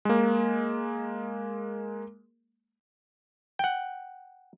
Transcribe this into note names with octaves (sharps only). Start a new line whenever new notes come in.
G#3 A#3
F#5 G5